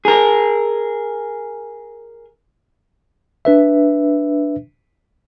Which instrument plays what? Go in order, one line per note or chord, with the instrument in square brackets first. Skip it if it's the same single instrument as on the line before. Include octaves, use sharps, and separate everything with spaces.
[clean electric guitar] G#4 A#4
[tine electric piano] D4 B4 E5